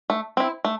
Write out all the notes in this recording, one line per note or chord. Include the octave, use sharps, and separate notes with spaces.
A3
C4 E4
A3